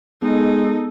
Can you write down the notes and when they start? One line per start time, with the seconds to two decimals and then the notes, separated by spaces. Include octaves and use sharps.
0.22 G#3 B3 D#4 A4